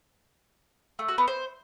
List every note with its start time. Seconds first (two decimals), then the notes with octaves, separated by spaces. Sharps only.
0.99 A3
1.09 F#4
1.18 B3
1.28 C5